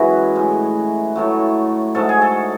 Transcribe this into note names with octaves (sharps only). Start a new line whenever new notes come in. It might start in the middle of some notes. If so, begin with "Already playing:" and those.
Already playing: F#2 E3 G#3 E4 F#4
A2 G#3
A2 F#3 A3
G#2 F#3 A3 A4
G#4
A4